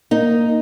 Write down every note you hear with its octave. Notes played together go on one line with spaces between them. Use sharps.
A#3 D#4